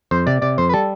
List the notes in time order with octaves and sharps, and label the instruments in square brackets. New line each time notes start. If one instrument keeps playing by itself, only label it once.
[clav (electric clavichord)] F2 [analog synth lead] C5
[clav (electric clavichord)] C3 [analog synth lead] D5
[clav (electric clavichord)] C3 [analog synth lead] D5
[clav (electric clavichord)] F2 [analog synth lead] C5
[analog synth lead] B4
[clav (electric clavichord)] G3 [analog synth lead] A4